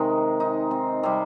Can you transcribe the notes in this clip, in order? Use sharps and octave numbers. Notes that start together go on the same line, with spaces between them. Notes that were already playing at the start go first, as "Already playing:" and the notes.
Already playing: C3 D#3 G#3 D#4
D#4
C4
C3 G3 C4